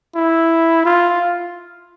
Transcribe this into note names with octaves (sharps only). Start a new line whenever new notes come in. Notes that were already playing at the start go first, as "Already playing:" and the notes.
E4
F4